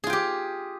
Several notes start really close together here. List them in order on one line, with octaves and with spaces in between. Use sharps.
G#4 F4 G5 G4